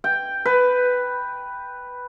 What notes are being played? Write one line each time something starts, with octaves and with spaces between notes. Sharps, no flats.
G5
B4